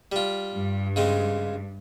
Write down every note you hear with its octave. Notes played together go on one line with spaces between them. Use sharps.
G3 F4
G2
C#3 G#3 C4